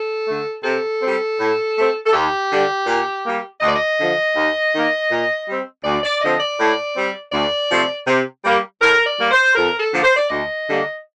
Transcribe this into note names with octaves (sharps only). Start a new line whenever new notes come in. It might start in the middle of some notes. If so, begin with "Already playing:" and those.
Already playing: A4
D3 A3
C3 A4
G3 C4
A2
A3 C4
A4
D#2 G4
D3 G3
A#2
G3 A#3
D2 D#5
D5
D#5
D3 F3
D#2
D#3 A#3
A#2
G3
C4
D2 D5
D5
D3 F3 C4 D#5
D5
A2
G3 C4
D2 D5
C3 F3 A3 C4
C3
G3 A#3
A2 A#4
D5
G3 A#3
C5
F2 A#4
A4
D3 F3 A#3
C5
D5
D2 D#5
D3 G3 A#3